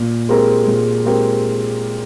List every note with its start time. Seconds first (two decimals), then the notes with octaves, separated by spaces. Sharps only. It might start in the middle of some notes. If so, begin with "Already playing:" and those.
Already playing: A#2
0.29 G#3 C4 G4 A#4
0.68 A#2
1.05 G#3 C4 G4 A#4